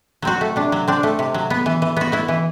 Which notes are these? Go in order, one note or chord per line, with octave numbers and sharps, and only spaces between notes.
F#3 C4 F#4
A3
C3 D4
F#3
C4 D4
A3
C3
F#3
B3
E3
E3
B3 F#4
B3 E4
E3